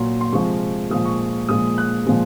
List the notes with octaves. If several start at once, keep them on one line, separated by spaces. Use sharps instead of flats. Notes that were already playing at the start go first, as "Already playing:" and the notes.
Already playing: A#2 F#3 C6
C6
C3 F3 G#3 C#6
A#2 F3 G#3 D#6
C#6
A#2 F3 G#3 D#6
F#6
A#2 F3 G#3